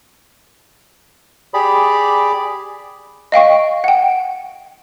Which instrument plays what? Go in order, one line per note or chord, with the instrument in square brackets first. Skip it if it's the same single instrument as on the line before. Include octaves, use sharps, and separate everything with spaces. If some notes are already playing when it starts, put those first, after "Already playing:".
[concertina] G4 G#4 D5 B5
[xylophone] D#5 F5 G5 C#6
F#5 G5